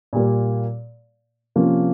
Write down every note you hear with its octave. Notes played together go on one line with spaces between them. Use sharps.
A#2 G3 A#3
C3 F3 A#3 C#4 F4